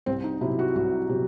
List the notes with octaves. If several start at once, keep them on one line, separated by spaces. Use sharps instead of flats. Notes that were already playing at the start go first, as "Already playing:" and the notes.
C2 C4
D#4
C3 F#3 E4
F#4
C2 F#4
C3 F#3